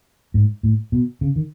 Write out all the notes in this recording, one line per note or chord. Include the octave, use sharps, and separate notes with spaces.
G#2
A2
B2
C#3
D#3